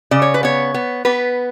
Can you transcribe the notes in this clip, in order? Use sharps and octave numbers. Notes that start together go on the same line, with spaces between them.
C#3 D5
C#5
B4
B3 C#5
B3
B3 B4